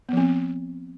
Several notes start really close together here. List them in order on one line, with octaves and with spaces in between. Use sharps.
B3 F3 C4